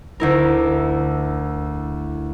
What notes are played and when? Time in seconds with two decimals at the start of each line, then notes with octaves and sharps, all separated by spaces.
0.20 D2 E4 A#4